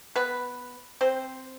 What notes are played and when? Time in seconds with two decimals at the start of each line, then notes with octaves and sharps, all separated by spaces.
0.16 B3 B4
1.01 C4 C5